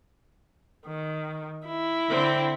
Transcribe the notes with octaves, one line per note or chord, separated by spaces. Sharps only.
D#3
E4
D3 C4